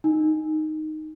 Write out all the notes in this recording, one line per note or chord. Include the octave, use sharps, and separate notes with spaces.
D#4